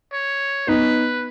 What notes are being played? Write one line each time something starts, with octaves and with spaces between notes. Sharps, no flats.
C#5
B3 D#4 B4